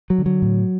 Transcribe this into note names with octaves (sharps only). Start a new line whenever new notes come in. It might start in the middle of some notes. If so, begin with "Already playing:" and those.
F#3
D3
F#3
A2